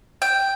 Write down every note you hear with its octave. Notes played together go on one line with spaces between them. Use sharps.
G5